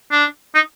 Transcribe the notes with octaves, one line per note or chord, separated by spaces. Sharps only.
D4
D#4